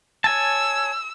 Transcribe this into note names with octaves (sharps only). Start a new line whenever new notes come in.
C#5 G#5 A5 E6